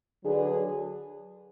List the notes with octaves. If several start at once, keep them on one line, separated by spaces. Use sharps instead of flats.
D3 F#3 D4 G#4 B4